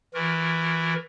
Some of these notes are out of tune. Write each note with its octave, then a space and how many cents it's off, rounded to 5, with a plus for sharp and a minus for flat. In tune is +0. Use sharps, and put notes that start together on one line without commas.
E3 +0 F4 +45 A#4 +15